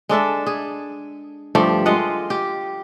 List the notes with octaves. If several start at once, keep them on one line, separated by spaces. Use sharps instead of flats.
G#3 D4 A4 E5
G#4
G2 F3 A3 G4
G#3 F4 D#5 F#5
G4